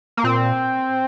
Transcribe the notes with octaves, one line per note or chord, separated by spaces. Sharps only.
A#3
A#2 C4